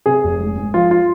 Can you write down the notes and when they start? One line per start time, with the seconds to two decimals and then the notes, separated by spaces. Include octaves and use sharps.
0.06 C3 G#4
0.24 F1
0.40 G#2
0.57 G#2
0.74 F3 F4
0.91 F4